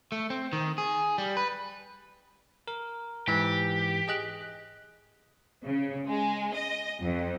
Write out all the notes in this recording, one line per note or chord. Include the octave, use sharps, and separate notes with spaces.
A3
C4
D#3
G#4
G3
B4
A#4
G#2 E3 G4
G#4 D#5 F#6
C#3
G#3
D#5
F2